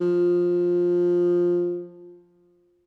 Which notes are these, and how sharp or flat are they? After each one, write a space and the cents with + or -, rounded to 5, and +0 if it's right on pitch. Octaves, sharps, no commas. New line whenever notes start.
F3 +10